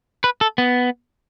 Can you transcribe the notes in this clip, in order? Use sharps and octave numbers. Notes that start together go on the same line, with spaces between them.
B4
A4
B3